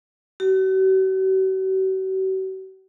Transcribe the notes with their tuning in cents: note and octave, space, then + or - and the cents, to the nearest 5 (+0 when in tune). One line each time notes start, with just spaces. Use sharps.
F#4 +45